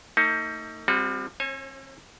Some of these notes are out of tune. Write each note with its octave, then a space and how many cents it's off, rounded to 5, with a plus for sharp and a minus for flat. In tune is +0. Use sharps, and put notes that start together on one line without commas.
A3 +45 D#4 +25
G3 +30 C4 +0 F#4 -25
C4 +40 C#5 -35 G#5 +15